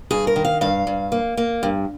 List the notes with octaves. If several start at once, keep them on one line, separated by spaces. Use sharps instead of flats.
G2 G#4
A#4
D#3
F5
G2 F5
G2
A#3
A#3
G2